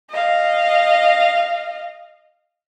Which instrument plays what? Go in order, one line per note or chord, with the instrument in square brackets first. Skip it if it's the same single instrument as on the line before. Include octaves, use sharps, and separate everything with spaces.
[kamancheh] D#5 F5